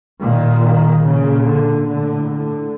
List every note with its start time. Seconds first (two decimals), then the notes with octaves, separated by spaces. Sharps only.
0.23 A#2 D#3
0.64 D#3
1.05 A#2 C#3
1.46 D3
1.87 A2 D3
2.29 D3